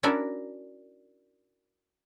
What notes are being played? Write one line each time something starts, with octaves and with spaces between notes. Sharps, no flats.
C#4 D4 E4 F#4 A4 A#4